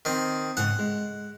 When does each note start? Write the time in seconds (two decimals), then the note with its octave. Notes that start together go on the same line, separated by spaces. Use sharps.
0.05 D#3 C4
0.57 G#2 C#3 F#5
0.79 G#3